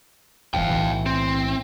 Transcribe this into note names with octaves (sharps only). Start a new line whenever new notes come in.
D1 G1 E3 F5 G5
B1 A2 E3
C4